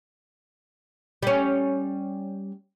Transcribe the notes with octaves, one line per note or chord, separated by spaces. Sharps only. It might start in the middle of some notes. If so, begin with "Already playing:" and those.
G3 C#4